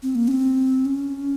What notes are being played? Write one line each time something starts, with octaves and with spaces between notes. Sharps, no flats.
C4
A#3
C#4
C4
C#4